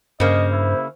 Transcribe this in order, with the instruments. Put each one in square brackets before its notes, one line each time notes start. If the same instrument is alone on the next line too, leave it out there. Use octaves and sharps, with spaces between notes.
[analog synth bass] G2 [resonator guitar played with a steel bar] C#3 A#3 [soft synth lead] C5 [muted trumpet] D#5
[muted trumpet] E4